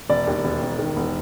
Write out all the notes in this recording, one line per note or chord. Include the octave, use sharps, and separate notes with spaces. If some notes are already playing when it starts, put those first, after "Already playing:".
E1 D5
D#2
E1
E1
D#3
E1